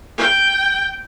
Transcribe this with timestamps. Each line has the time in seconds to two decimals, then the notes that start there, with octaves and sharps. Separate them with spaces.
0.18 G5